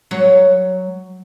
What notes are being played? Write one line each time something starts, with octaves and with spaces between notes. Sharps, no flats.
F#3 C#5